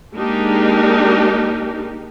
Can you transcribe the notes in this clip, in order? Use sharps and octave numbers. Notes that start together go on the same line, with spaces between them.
G#3 A#3 D4 D#4 G4 A#4